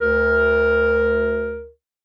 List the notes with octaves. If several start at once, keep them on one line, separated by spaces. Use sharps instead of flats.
D2 A#4